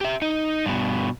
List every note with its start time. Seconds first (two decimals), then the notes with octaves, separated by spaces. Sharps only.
0.01 G4 E5
0.22 D#4
0.66 G2 B2